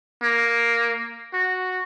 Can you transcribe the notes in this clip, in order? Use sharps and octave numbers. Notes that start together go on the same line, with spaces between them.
A#3
F#4